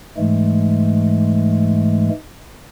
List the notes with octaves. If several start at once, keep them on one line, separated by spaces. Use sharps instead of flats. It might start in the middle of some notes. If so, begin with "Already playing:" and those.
G#2 E3 G#3 A3